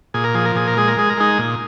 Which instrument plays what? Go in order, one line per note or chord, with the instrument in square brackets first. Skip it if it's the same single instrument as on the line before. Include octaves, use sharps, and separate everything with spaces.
[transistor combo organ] A#2 G#4
A#4
F3 G#4
A#4
A#2 G#4
A#4
G#3 G#4
A#4
G#3 G#4
A#4
G#3 D#4 G#4
A#2